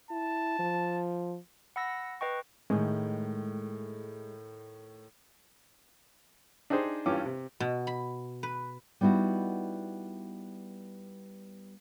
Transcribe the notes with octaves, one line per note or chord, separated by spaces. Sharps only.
E4 A5
F3
F#5 B5 E6 A#6
B4 D#5 G5 C#6
A2 D#3 G#3
D4 D#4 G4 G#4 C5
G2 E3 C#4 F4 G4 D6
C3
B2
B5
B4
G3 B3 D#4 E4 F#4